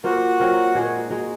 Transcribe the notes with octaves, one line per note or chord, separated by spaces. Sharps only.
A#3 F4 F#4 C5
F#3 C4 F4 A#4
A#2 G#3 D#4 G#4
G#3 D#4 F#4